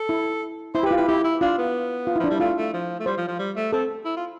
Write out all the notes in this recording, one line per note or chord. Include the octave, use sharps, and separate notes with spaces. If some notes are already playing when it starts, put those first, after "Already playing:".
Already playing: A4
E4
E4 C5
G4
B4
F4
E4 B4
E4 G4
E4
D4 F4
B3
F4
E4
F3 D4
G3 E4
A3 F4
A3
F3
A3
G3 C5
F3
F3
G3
A3
C4 A4
E4
F4